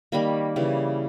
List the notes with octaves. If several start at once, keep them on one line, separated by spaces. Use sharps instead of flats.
D#3 G3 A#3 B5
C#3 E3 G3